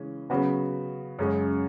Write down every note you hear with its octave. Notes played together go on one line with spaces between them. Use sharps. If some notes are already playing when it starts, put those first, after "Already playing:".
Already playing: C#3 E3 G#3 C#4
C#3 F#3 B3 F#4
F#2 C#3 G#3 C#4 G#4